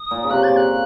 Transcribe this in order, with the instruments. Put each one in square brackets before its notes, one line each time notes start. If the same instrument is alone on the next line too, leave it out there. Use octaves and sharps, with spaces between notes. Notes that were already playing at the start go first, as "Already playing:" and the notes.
Already playing: [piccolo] D#6
[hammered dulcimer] A#2
C#3
[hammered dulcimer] C3 [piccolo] F#6
[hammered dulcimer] A#2 [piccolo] A6
[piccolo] F#6